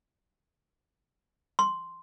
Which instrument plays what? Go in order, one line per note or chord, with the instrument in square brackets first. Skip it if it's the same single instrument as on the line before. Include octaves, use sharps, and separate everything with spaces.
[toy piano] C6